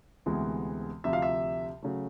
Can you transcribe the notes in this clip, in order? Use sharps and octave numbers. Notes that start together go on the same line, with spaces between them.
D2 C3 E3 G#3 B3
D2 C3 F3 E5
F5
E5
C#3 F#3 A3